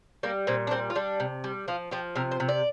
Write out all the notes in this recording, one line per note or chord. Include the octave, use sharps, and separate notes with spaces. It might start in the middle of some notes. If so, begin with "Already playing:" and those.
G3 A#3
A#2 C4
D4
G3 C4
F4
G3 D4
C3
G3
F3 F4
F3 G4
C3 A#4
C5
C3
D5